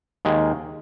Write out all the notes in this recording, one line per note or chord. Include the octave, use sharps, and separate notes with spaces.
D#2 D#3 G#3